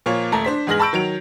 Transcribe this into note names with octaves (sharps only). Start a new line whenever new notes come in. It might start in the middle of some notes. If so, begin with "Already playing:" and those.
A#2 F3 A#3 C#5
D#1 A3 A5 A#5
D4 C5 B6
E2 G#2 G#4 F6 A#6 F#7
A5 B5 C#6 E6 G6 D7
D#3 F#3 D7 F7